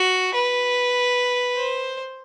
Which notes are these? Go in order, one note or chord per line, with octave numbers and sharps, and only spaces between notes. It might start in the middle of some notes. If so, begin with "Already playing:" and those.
Already playing: F#4
B4
C5